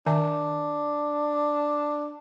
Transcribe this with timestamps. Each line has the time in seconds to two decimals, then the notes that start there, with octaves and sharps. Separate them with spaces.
0.06 D#3 D4 E5 G#5